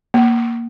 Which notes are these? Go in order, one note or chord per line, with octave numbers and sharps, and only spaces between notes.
A#3